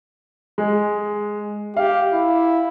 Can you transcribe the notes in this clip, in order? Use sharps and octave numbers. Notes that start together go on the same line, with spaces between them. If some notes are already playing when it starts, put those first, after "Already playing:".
G#3
G4 F5
E4